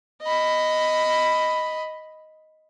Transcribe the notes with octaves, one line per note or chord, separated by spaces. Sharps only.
D#5 B5